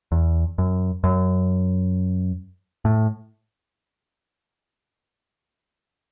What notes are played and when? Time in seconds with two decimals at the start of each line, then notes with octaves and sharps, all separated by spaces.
0.12 E2
0.58 F#2
1.04 F#2
2.85 A2